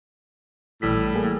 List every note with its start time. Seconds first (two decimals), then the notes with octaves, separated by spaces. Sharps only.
0.82 A#1 A2 E3 G3 B6
1.14 E3 A#3 G#4